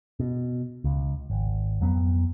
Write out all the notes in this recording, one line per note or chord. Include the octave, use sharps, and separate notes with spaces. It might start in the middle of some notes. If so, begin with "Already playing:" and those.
B2
C#2
G#1
F2 F#3 B3